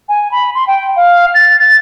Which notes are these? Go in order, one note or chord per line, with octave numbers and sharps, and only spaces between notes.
G#5
B5
C6
G5
F5
A6
A6